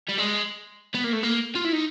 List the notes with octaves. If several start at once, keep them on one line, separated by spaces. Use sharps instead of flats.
G3
G#3
B3
A#3
A3
A#3
F4
E4
D#4